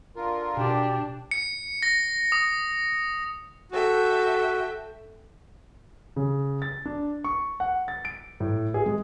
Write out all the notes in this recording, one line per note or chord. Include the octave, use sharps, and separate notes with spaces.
D3 F4 A#4
B2 D4 G4
C#7
A#6
D#6
F#4 A4 E5 G5
C#3
A6
D4
C#6
F#5
A6
D7
A2
G#4
G#3